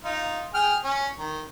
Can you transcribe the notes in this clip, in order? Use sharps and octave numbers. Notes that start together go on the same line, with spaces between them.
D#4 F4
G#4 G5 F6
C#4
D#3